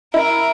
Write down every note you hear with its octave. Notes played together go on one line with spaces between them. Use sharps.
E4 A#4